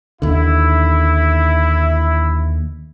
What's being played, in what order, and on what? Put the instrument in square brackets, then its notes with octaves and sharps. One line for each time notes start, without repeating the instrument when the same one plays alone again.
[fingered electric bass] D#2 D3 [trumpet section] E4